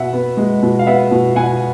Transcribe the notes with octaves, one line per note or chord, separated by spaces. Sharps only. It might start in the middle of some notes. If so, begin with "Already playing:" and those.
Already playing: B2 E5 F#5
B3
G#3
B2
F5
B3 E5 F#5
B2
B2 F#5 G#5